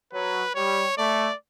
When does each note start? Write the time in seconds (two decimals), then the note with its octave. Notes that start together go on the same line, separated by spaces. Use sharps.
0.13 F#3 B4
0.55 G3 C#5
0.97 A3 D5